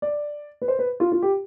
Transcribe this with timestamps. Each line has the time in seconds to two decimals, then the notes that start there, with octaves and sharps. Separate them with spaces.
0.02 D5
0.62 B4
0.68 C5
0.79 B4
1.00 F4
1.12 F4
1.22 G4